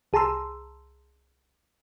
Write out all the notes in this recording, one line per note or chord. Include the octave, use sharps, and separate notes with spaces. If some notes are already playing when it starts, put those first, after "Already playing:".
C2 G#4 A5 A#5 C6 E6